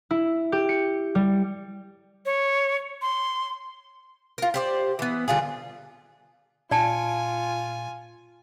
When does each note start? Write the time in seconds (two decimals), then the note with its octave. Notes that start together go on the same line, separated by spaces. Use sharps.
0.11 E4
0.52 G4
0.69 C#7
1.15 G3
2.26 C#5
3.02 C6
4.38 F4 A#4
4.54 G4 C5 D5
4.99 E3 B3
5.28 D3 G3 F4 G#4
6.71 A#2 F4 D5 G#5 A5 C#7